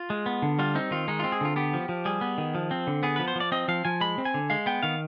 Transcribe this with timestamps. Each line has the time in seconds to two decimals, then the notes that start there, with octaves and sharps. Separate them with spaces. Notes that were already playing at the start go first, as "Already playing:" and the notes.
Already playing: F4
0.10 G#3
0.26 B3
0.42 D3
0.59 G3 F4
0.75 C4 D#4
0.91 D#3 F4
1.08 G#3 D#4
1.20 C4 F4
1.32 G#4
1.41 D3 F4
1.56 B3 G4
1.73 F3
1.89 F3
2.05 G3 G#4
2.21 B3
2.38 D#3
2.55 F3
2.71 C4
2.87 D3
3.03 B3 G#4
3.16 F3 B4
3.28 C5
3.35 F3 D5
3.52 C4 D#5
3.68 F3 F5
3.85 F3 G#5
4.01 G#3 B5
4.18 C4
4.25 G#5
4.34 D3
4.50 G#3 F5
4.66 B3 G5
4.83 D#3 F5